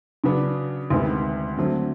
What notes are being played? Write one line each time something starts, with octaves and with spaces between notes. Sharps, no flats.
C#3 F#3 B3 D4
D2 C3 D#3 G#3 B3
D3 F#3 A3 C4